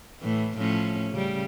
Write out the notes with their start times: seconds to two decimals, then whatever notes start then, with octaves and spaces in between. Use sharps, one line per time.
0.21 A2 E3
0.57 A2 F3 C#4
1.11 C#3 G3